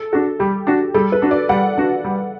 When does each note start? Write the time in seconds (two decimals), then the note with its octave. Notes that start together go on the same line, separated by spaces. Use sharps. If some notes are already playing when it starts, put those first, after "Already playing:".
Already playing: A4
0.13 D4 F#4 A4
0.39 G3 G4
0.67 D4 F#4
0.94 G3 A4
1.12 B4
1.22 D4 F#4
1.31 D5
1.49 G3 F#5
1.77 D4 F#4
2.04 G3